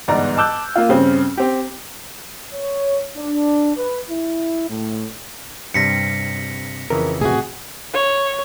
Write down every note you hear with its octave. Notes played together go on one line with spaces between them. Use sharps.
G1 E2 G#2 D5 A#5
A5 D6 E6 F#6 G6
A#3 F4
G2 C#3 C4
C4 G4
C#5
D4
B4
E4
A2
G2 C3 G3 A#6 B6 C#7
F2 C#3 E3 A#4
A2 C3 F#4 G#4
C#5